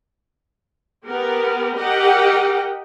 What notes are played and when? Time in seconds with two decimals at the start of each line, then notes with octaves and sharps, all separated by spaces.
1.06 B3 G4 A#4
1.77 G4 A#4 D#5 F#5 G5